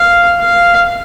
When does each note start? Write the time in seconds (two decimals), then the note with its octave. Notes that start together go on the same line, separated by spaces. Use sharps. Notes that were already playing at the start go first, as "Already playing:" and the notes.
Already playing: F5
0.40 F5